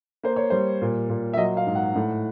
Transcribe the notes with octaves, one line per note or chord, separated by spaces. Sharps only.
A#3 C5
C#5
G3 C5
A#2
A#2
E5
F#3 D#5
F5
G#2
F#5
A2